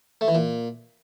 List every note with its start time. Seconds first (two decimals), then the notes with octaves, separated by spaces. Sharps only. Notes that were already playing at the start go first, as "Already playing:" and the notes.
0.21 A3
0.28 E3
0.35 A#2